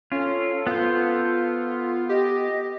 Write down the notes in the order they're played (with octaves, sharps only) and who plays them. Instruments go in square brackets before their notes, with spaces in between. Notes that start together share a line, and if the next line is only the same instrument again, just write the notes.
[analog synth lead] C#4 [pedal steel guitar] F4 [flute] A4
[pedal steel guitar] B3 C5 [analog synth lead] F4
[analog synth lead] G4 [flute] D#5